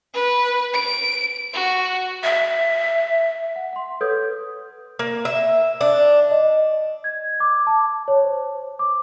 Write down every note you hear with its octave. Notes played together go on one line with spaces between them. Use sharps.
B4
D7
F#4
E5
F#5
F#5 C6
A4 B4 C#5 D#6 G6 G#6
A#3
E5
D4
D#5
G#6
D6
A5
C#5
C5
D6